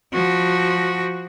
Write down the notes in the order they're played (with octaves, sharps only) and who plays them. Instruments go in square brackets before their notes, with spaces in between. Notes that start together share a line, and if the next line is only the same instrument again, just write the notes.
[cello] F3 F#4